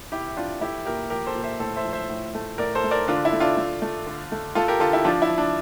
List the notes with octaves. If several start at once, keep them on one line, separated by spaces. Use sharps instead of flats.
C3 E4 G4
E3 D4 F4
A3 E4 G4
A#2 G4 A#4
F3 G4 A#4
A4 C5
A#2
C5 E5
A2 A4 C5
C5 E5
F3
C5 E5
A2
A3
A2 A#4 D5
A4 C5
A3
A#4 D5
D3 D4 F4
E4
A3
D4 F4
A3
A3
D3
A3
A3 F4 A4
G4 A#4
D3 F4 A4
E4 G4
F3 D4 F4
E4
F3
D4